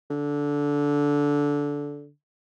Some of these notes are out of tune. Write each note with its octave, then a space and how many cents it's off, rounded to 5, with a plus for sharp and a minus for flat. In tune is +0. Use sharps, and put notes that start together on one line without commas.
D3 -15